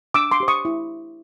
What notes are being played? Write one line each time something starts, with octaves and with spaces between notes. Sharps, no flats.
D4 D6 E6
C6 D6
G4 C5
C#6 D#6
E4